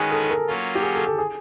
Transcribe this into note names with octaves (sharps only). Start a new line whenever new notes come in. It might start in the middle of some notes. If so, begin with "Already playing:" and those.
Already playing: D#3 G#3 C#4 F#4 G#4 B4
A4
A4
A#4
A4
F#3 A#3 C#4 F4
G4
G#4
A4
A4
G#4